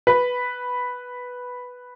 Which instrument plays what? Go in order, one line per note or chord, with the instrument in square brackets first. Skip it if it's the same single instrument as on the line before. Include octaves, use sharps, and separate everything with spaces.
[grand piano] B4